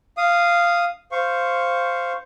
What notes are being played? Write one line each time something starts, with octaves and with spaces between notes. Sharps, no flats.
F5 D#6
C5 F5 C#6